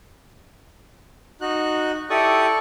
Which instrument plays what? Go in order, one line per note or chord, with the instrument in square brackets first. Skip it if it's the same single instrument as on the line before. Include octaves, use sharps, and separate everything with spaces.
[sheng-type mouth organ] D#4 F#4 F#6
[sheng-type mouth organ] E4 G4 D#6 [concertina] A4 D5 C#6